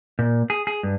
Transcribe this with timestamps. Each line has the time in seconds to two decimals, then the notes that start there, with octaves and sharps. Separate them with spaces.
0.19 A#2
0.50 G#4
0.67 G#4
0.83 G2